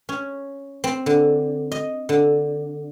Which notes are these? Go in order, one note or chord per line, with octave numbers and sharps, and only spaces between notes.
C#4
C4
D3
D#5
D3